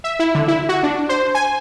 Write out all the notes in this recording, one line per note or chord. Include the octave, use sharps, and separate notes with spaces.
E5
E4
D3
E4
F#4
D4
C5
G#5